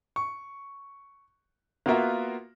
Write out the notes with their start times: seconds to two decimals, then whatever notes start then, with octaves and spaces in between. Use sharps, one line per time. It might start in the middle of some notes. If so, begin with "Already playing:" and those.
0.16 C#6
1.86 A#3 B3 F4 F#4 A#4 E5